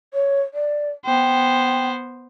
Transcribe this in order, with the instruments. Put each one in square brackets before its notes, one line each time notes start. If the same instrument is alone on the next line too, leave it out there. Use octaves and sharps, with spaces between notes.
[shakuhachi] C#5
D5
[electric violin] B3 C5 [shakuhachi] G5